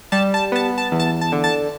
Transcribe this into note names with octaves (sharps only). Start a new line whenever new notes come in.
G3 A5
A5
B3 A5
A5
E2
A5
A5
D3
A5